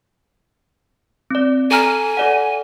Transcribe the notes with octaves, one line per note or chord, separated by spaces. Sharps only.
C4 D5
A4 G#5 A#5 F6
A4 D5 F#5